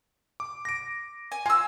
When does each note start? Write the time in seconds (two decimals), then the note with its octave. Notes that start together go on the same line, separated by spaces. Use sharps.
0.40 D6
0.65 A#6 D7
1.32 G#5
1.46 F4 G#5 E6